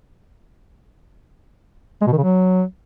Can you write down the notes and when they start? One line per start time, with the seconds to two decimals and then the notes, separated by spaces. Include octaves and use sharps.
2.02 G#3
2.07 B2
2.12 D#3
2.18 C#3
2.23 F#3